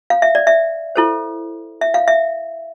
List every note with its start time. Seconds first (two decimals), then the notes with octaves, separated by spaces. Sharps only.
0.10 F5
0.22 E5
0.35 D5
0.47 E5
0.96 E4 A4 C5
1.81 E5
1.94 F5
2.08 E5